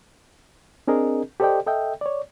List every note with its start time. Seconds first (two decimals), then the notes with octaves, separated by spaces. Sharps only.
0.88 C4 D4 G#4 A#4 D#5
1.40 G4 A4 C5 D5 D#5 G5
1.66 A4 D#5 E5 G5
2.01 C#5 D5